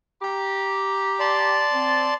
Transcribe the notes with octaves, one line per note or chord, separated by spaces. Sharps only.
G4 A#5
D5 A5 C6
C4